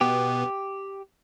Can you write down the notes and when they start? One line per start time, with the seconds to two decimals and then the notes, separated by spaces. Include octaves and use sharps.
0.01 B2 B3 G4